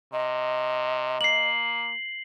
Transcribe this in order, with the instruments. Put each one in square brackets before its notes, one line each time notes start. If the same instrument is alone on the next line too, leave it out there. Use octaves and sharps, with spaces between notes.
[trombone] C3 [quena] D#5
[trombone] A#3 [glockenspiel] C7 F#7